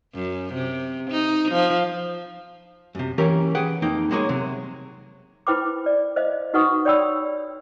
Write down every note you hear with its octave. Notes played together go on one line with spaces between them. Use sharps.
F#2
C3
D#4
F3
F#2 C3
E3 F#3 A#3 C#4 G4 A#4
G#4 B4 F#5 G5
F2 A#3 D#4 G5
F#3 G#3 A#3 G#4 C#5
C3 F#3 C4
E4 B4 C5 G5 B5 D6
D5
C5 D#5 F5
D#4 F#4 B4 F#5 C#6 D#6
C#5 D5 G5 B5 C6 E6